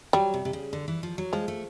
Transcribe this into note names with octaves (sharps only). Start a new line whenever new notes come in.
F#3 G3
C3
C3
C#3
D3
E3
F3
F#3
F3 G#3
A3